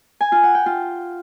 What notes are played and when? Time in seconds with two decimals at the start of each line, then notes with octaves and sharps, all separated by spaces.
0.21 G#5
0.32 F4
0.43 F#5
0.55 G5
0.66 F4